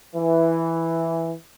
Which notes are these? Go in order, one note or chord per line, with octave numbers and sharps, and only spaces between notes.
E3